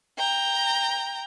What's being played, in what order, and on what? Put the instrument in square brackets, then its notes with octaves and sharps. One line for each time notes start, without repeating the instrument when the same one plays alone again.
[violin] G5 A#5